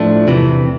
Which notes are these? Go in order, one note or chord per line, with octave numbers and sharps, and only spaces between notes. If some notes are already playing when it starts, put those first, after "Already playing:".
Already playing: A2 F3 A3 D4
E2 C3 E3